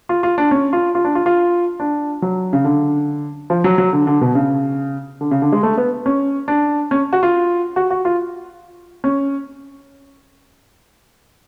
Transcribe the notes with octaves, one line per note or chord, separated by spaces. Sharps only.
F4
F4
D4
C#4
F4
F4
D4
F4
F4
D4
F#3
C#3
D3
F3
F#3
F#3
D3
D3
B2
C#3
D3
C#3
D3
G#3
A3
B3
C#4
D4
C#4
F#4
F4
F#4
F#4
F4
C#4